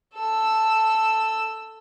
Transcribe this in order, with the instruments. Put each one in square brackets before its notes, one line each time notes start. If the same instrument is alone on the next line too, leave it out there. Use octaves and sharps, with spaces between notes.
[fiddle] A4 E6